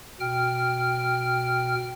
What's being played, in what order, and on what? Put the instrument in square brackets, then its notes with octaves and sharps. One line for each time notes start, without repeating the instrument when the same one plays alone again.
[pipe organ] B2 G5 F6